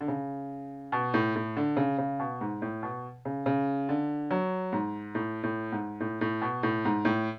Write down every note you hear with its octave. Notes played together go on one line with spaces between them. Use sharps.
D3
C#3
B2
A2
A2
D3
C#3
C#3
B2
G#2
A2
B2
C#3
C#3
D3
F#3
G#2
A2
A2
G#2
A2
A2
B2
A2
G#2
A2